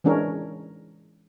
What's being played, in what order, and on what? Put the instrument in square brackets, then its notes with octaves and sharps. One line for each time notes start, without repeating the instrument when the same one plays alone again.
[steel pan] E3 G#3 C#4 D4 A#4